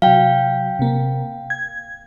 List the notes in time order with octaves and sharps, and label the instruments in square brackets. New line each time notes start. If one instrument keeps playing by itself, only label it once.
[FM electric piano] C3 F#3 [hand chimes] F5 G5
[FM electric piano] C3 A#3
G#6